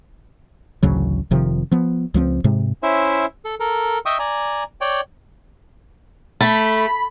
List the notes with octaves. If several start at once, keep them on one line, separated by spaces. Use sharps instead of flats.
A1 D2 C#3 F#3
F1 C3 D#3 F3
F3 B3
C#2 F3 G3 C4
G#2 C3 G#3
C#4 E4 C5 E5
A4
A4 A#4
D#5 E5 G5 C#6 D#6
D5 G#5 A#5
C#5 D5 G5
A3 B5